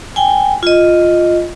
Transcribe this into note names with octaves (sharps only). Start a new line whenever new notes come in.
G5 G#5
F4 D#5